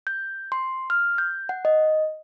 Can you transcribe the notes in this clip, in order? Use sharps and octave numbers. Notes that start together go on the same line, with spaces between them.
G6
C6
F6
G6
F#5
D#5